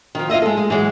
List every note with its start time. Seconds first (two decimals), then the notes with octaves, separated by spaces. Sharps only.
0.15 D#3 F3
0.30 F4 F#4 D#5 E5
0.42 G#3 A4
0.57 G#3
0.70 E3 F#3 G#3